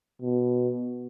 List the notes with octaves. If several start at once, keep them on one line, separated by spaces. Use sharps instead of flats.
B2